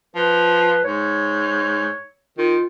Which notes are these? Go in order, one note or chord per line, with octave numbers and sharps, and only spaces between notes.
F3 B4
G#2 C#5
D#3 F4